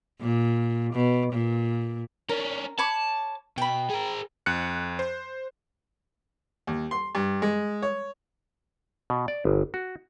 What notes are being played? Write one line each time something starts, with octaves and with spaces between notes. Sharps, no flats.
A#2
B2
A#2
C#4 D4 A#4
C#5 A5 B5 D6
B2 G5 B5
G#4 A#4
F2 F#6 C#7
C5
D#2
C6
G2
G#3
C#5
B2
D5
G1
F#4